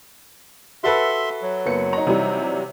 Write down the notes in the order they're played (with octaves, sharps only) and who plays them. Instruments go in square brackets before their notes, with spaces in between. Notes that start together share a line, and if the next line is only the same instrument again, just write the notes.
[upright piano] F#4 A4 B4 [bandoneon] E5 C6
[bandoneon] F#3
[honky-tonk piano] F#1 B3 C#7
[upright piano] D#4 A#5
[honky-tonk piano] C3 E3 G3